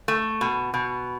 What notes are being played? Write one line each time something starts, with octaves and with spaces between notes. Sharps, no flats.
A3
B2
B2